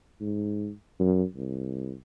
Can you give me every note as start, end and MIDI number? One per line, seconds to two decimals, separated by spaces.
0.21 0.70 44
0.99 1.23 42
1.36 1.93 36